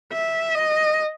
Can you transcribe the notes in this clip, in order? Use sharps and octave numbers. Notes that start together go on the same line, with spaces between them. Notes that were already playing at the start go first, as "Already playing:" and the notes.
E5
D#5